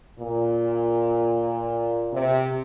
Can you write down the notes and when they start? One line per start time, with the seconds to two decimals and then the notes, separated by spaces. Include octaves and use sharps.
0.20 A#2
2.12 C3